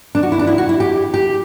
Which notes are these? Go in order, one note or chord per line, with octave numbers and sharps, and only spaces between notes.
D4
F#4
E4
D4
E4
F#4
E4
G4
G4